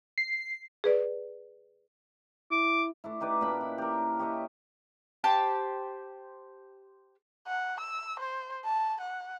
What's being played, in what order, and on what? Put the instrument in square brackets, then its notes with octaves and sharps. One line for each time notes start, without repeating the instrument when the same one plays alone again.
[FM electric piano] C7
[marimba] G#4 B4 D5
[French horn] E4 [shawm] D6
[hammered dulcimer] A3 D4 E4
D#4 G4 B4 D5
A#2 C#4 D4 B5
E4
G4 A#4
G4 C#5 D#5 E5
[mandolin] G4 C5 A5
[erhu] F#5
E6
C5
A5
F#5